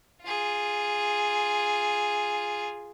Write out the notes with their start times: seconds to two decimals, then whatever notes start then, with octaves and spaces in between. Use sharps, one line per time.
0.23 F4 G#4